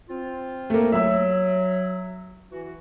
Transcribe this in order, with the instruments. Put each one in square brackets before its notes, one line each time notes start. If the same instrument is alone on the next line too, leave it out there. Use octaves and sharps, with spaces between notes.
[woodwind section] C4 F4
[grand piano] A3 A#3
[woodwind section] F#3 [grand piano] E5 E6
[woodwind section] E3 F#4